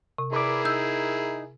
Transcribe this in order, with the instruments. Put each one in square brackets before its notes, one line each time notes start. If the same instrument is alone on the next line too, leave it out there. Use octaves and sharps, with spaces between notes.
[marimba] C3
[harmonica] E4 G#4 A#4 [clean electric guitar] B4 D5
[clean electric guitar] D#4 [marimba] E6 G6